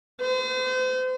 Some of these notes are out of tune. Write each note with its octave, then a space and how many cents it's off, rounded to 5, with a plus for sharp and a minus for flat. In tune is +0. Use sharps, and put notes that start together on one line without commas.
C5 -40